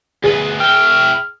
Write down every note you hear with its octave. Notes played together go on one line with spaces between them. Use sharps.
D2 G#4 B4
E4 G5 F6